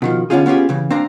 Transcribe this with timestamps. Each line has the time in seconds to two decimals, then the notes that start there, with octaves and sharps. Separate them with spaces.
0.02 B2 D#3 F3
0.30 D3 B3 C#4 D#4 F4 G#4
0.46 B3 C#4 F4 G4 G#4
0.69 C#3 E3
0.90 C4 D4 F5 A#5